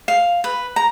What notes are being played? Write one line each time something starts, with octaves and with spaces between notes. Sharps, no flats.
F5
B4
A#5